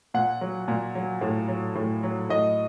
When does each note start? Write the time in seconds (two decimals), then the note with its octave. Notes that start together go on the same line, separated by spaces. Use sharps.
0.14 A#2 F#5
0.41 F#3
0.68 A#2
0.95 F#3
1.21 A2
1.48 F#3
1.75 A2
2.03 F#3
2.29 A2 D#5